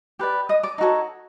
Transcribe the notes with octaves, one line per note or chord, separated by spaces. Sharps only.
G4 B4 D5
D#5 D#6
D5 D6
D#4 F#4 A4 C#5